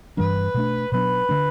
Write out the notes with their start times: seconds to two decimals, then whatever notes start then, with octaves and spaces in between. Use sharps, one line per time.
0.17 G2 E3 G3 D4 B4
0.54 B2 A3 D4
0.92 B2 F#3 B3 D4 B4
1.29 D3 A3 D4